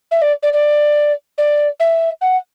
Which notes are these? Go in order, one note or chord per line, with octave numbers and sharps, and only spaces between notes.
E5
D5
D5
D5
D5
E5
F#5